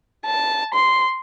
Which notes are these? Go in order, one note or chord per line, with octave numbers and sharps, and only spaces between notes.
A5
C6